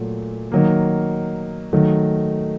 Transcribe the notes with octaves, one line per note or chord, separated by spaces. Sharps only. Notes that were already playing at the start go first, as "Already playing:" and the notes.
Already playing: A#2 F#3 A3
D#3 F#3 A#3
D#3 F#3 A3